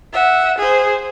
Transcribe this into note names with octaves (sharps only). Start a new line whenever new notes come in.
E5 F#5
G#4 C5